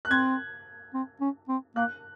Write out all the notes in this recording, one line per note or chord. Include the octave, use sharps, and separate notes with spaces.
F#6
C4 G#6
C4
C#4
C4
A#3 F#6